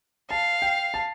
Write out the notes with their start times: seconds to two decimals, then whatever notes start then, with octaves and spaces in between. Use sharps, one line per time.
0.31 F5 A5
0.62 G5
0.94 A5